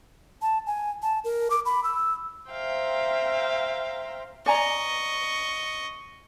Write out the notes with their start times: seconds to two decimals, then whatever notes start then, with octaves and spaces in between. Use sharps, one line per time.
0.42 A5
0.67 G#5
1.02 A5
1.24 A#4
1.50 D6
1.66 B5
1.84 E6
2.50 C5 E5 F5 G5 A#5
4.46 D5 D#5 G#5 A#5 C#6